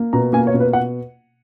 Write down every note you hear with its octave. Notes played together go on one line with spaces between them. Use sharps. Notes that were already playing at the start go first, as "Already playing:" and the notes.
Already playing: A#3
B2 A#5
A#3 G#5
C#5
B2
B4
F#5